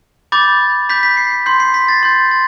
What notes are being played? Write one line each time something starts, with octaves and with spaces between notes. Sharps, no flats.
B5 D6 G6 A6
B5 D6 G6 B6
B6
C7
B6
C6 G6 C7
C7
B6
A6
C6 G6
A6